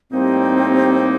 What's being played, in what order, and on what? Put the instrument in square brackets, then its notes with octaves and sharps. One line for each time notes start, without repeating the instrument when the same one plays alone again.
[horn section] A2 G3 A#3 D#4 G4 [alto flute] C4